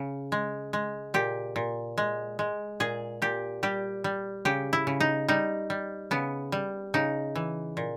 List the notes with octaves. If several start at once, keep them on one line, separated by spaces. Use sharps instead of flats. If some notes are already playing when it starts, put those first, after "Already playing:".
Already playing: C#3
G#3
G#3
A#2 G4
A#2
G#3
G#3
A#2 G#4
A#2 G4
G3 G4
G3
C#3 G4
E4
C#3
D#4
G3 D#4
G3
C#3 B3
G3
C#3 D#4
E3
A#2